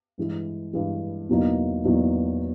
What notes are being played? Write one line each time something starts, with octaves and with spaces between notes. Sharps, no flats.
G2 E3 G#3
G2 E3 G#3
E2 B2 F#3 A#3 D#4
E2 B2 F#3 A#3 D#4